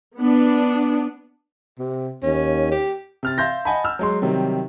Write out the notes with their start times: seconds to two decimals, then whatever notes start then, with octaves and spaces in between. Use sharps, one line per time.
0.18 B3 D4
1.79 C3
2.23 D#2 C#4
2.72 G4
3.23 C3 F6 A6
3.38 E5 F5 C6 G6 A#6
3.65 D#5 F#5 G#5 A5 B5
3.84 E6 F6
3.99 F#3 G#3 C6
4.22 C3 D#3 F#3 G3